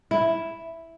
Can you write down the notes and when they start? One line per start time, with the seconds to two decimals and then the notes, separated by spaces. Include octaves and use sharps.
0.11 E4